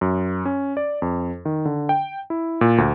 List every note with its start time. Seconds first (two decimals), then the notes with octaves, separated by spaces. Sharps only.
0.01 F#2
0.45 C#4
0.77 D5
1.02 F2
1.45 D#3
1.65 D3
1.89 G5
2.30 E4
2.61 A#2
2.78 D2